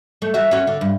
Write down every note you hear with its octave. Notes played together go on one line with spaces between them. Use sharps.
A3
F#4 E5
C#4 F#4
D3
G2